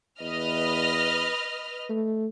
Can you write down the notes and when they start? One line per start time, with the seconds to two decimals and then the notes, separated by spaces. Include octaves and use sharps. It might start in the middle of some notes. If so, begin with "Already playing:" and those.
0.20 E2 B4 D#5 F6
1.89 A3